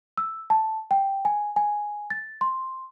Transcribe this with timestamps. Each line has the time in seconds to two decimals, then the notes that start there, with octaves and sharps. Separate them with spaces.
0.18 E6
0.50 A5
0.91 G5
1.25 G#5
1.56 G#5
2.10 A6
2.41 C6